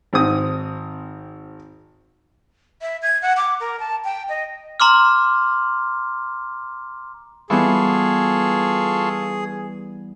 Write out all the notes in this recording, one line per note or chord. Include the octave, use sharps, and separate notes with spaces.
G#1 C4 D#6
E5
G#6
F#5
D6
A#4
A5
G5
D#5
A#5 C6 D6 F6
E3 G3 B3 F4 G#4 A4 C#6